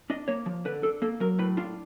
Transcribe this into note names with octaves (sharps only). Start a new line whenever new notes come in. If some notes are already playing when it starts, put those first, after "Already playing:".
D4 D#5
A#3 C#5
F3
D3 B4
D4 A4
A#3 A4
F#3 A#4
A2 B4
D4 F4